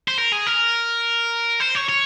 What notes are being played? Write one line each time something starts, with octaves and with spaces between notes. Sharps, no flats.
C5
A#4
G#4
A#4
C5
C#5
C#5